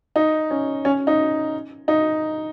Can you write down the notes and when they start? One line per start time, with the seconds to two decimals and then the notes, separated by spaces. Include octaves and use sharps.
0.16 D#4
0.51 C#4
0.85 C#4
1.07 D#4
1.88 D#4